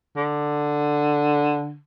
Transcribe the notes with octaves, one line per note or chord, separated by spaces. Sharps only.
D3